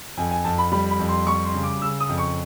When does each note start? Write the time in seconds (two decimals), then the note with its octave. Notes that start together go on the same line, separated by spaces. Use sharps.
0.17 F2 G#5
0.31 G#5
0.45 F2 A5
0.58 B5
0.72 G3 B5
0.91 B5
0.99 F2
1.09 C6
1.27 G3 C#6
1.45 C6
1.54 C#3
1.63 D6
1.81 C#3 E6
2.00 D#6
2.09 F2
2.18 C#6